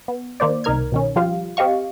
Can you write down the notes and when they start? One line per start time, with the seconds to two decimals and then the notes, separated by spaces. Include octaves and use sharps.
0.08 B3
0.40 D#3 A#3 C5 D5
0.64 C2 D#4 A#4 F6 G#6
0.92 B2 D#3 C#4
1.16 F3 G3 F4 G4 F5
1.57 C4 G4 D#5 F5 C#6